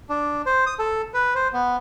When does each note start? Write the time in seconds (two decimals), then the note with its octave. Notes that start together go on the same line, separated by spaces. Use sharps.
0.09 D4
0.46 C5
0.67 D#6
0.79 A4
1.14 B4
1.35 C5
1.53 B3